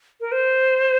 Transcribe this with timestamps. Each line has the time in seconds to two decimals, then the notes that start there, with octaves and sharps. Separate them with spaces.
0.21 A#4
0.32 C5